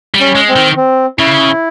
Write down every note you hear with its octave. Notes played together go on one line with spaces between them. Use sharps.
G3
C#4
G#3
C4
D#3
C4
C#3 E4